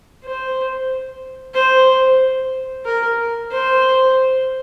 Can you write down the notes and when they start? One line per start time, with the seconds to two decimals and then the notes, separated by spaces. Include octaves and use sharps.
0.24 C5
1.54 C5
2.85 A#4
3.52 C5